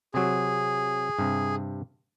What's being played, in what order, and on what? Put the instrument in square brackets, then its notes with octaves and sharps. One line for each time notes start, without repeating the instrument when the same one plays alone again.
[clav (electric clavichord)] C3 F#3 [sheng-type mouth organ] G#4
[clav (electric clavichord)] G2 C3